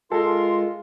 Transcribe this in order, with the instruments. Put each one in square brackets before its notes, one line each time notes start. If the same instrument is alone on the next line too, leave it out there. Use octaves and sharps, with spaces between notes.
[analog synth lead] G#3 [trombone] F4 [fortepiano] A4 [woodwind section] A#4 C6